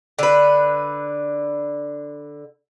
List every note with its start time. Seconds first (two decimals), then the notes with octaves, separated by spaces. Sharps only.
0.19 D3 B4